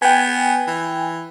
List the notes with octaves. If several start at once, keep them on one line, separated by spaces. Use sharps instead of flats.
B3 G5 G#5
E3